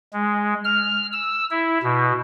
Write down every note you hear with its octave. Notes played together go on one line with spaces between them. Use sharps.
G#3
F6
E6
E4
B2